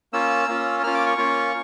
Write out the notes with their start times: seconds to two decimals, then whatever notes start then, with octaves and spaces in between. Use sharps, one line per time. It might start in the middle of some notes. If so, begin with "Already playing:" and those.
0.13 A#3 C#4 F4 E6
0.48 A#3 C#4 F4
0.83 A#3 C#4 F4 F6
0.95 D6
1.06 C#6
1.18 A#3 C#4 F4